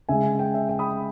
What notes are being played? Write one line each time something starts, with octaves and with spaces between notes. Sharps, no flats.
C#3 G#3 E5 G#5
G5
E5
G5
B5 D#6